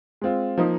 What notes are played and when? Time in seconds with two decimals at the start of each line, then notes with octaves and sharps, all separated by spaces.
0.22 G#3 C4 F4
0.58 F3 A#3 D#4